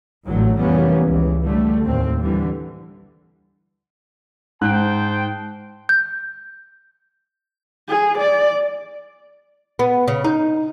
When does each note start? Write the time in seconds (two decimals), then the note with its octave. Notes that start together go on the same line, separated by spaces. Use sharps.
0.28 A1 D3 F#3 A3
0.58 F1 E3 G3 A#3 B3 C#4
1.06 C#2 E3
1.44 D3 G3 A3
1.85 D#2 A2 C4
2.22 D3 E3 G3
4.61 G#2 C5 G5 A5 F#6
5.89 G6
7.88 G#4
8.18 D5
9.79 B3
10.08 C#3
10.24 D#4